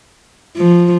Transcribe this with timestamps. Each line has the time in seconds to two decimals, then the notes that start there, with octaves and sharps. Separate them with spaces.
0.57 F3